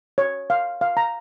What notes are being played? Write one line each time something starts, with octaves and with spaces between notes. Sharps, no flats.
C#5
F5
F5
A#5